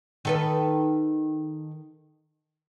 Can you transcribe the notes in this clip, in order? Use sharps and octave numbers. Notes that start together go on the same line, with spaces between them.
D#3 A4 B4